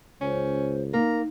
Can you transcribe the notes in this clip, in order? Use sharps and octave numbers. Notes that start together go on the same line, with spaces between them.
C#2 C#4 C5
A#3 D#4 A#5